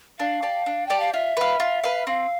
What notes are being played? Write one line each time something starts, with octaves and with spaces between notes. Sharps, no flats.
D4 F5
G4 D5 A5
D4
G4 D5 G5 A5
F5
F4 E5
B4 F5
F4
B4 F5
C4 F5